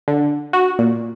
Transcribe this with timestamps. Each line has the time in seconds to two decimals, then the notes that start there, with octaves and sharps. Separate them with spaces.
0.08 D3
0.53 F#4
0.79 A#2